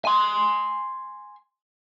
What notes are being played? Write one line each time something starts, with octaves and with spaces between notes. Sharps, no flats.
G#5 C6